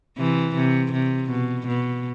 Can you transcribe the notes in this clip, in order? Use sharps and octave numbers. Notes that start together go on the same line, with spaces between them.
C3 E3
C3
C3
B2
B2